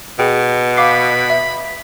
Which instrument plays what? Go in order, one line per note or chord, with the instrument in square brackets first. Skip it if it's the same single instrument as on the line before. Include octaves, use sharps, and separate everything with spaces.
[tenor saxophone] B2 [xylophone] G#4 G5
[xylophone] F5 D6 C7 [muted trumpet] B5
[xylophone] E5